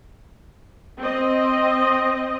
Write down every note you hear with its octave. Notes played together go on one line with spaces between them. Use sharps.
C4 D#5